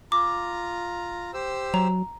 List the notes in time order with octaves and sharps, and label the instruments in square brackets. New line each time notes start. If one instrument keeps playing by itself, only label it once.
[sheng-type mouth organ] F4 A#5 [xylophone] D6
[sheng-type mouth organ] G4 C5 E6
[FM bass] F#3 [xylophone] A#5